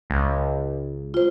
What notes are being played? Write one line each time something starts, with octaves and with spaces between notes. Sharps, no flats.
C#2
F4 C5